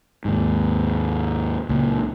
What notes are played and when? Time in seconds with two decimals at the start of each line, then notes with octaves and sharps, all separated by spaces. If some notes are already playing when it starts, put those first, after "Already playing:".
0.25 D#2 G#2
1.69 C#2 A#2